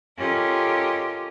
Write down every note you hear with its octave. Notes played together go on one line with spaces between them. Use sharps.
C#4 F4 G4 A4 A#4 D#5